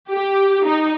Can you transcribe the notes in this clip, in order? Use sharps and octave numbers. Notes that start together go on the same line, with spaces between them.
G4
D#4